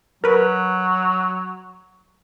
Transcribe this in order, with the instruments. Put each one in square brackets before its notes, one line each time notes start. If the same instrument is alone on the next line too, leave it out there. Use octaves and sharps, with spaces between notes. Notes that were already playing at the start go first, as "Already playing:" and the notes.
[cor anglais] F#3 [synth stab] A#4 B4